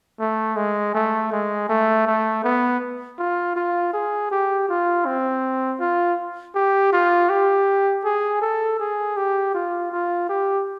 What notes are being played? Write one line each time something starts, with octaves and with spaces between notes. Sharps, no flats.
A3
G#3
A3
G#3
A3
A3
B3
F4
F4
G#4
G4
F4
C4
F4
G4
F4
G4
G#4
A4
G#4
G4
F4
F4
G4